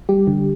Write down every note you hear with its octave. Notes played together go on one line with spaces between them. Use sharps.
G3 G4
D3